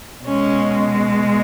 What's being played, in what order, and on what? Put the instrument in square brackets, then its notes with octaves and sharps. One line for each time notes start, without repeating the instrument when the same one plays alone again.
[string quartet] B2 G#3 C#4